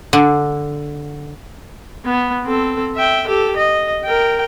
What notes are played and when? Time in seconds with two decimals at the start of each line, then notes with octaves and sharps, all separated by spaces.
0.13 D3
2.05 B3
2.45 C4 A4
2.95 E5 G5
3.27 G4 A4
3.56 D#5
4.04 A#4 G5